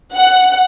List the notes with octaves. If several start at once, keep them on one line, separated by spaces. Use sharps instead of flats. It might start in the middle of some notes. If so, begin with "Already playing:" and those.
F#5